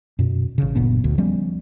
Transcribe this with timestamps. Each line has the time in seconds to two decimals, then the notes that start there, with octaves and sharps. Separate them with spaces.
0.19 F#2 B2
0.58 A1 C#3
0.75 F#1 A#2 B3 D4
1.04 D2
1.18 F3 G3 B3 C#4